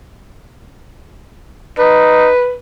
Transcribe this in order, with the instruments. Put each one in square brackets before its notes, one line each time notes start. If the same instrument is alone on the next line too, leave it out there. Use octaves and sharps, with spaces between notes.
[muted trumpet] D#4 [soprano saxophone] B4